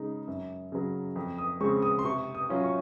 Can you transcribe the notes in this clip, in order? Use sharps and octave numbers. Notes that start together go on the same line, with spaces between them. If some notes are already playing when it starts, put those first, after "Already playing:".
Already playing: C#3 G#3 D#4
F#2
C#3 F#3
F2
D#6
C#3 G#3 C4 C#6
D#6
C6
C3 C#6
D#6
F#3 C#4 F4
C#6